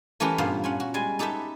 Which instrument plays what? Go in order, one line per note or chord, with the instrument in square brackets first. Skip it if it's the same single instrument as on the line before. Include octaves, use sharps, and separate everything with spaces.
[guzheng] E3 A3 C#4 G4 A#4 B4
G2 A#2 B3 C5 F5
C#4 F4 F#5
F#4
G3 G#3 G#5
D#4 G4 A4 B4 E5